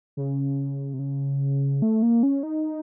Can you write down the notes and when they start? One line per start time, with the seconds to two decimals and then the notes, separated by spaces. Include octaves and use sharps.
0.17 C#3
0.94 C3
0.99 C#3
1.82 A3
2.02 A#3
2.23 C#4
2.43 D#4